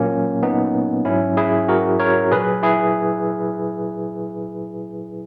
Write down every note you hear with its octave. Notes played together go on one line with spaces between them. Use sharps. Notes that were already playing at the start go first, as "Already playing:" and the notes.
Already playing: A#2 F#3 A#3 C#4
B3 D#4
G#2 F#3 C#4 E4
E4 G#4
F#4 A#4
A#4 C#5
A#2 F#3 G#4 B4
E4 G#4